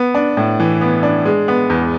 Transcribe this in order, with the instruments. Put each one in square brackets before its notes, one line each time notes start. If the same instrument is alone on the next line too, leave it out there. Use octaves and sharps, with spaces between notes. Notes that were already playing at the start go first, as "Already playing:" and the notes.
Already playing: [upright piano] B3
D4
A2
E3
B3
D4
G#3
B3
E2